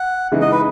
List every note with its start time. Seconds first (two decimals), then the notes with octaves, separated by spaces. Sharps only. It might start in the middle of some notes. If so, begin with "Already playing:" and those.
Already playing: F#5
0.32 C#3 E3 G#3 D#4
0.42 D#5
0.52 B4